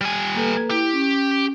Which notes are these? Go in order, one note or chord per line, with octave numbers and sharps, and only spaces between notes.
G3 G#5
A#3 A4 B4
E4 G4
C#4